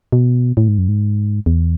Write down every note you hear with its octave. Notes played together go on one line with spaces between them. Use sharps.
B2
A2
G#2
F#2
G#2
E2